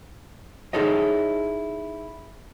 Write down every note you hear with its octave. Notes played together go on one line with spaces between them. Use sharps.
D#4 E4 G#4 A4 C#5 D#5